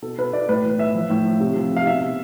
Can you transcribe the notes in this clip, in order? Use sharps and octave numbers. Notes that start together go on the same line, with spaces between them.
B2 A4
B2 B4
B2 D5
A2 B4
E3
E3 E5
F3
A2
F3
C3
F3
C3 F5
B2 E5
B2